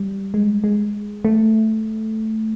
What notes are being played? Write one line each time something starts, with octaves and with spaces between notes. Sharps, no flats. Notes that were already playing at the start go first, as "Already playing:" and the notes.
Already playing: G3
G#3
G#3
A3